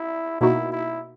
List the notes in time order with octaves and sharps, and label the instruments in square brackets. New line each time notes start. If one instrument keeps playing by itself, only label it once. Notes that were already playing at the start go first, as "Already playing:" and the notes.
Already playing: [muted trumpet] E4
[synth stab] B2 A#3 D#4 F#4 [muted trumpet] E4
[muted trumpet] E4